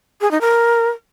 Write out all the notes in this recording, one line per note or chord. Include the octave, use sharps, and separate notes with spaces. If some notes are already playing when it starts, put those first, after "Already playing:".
G#4
D#4
A#4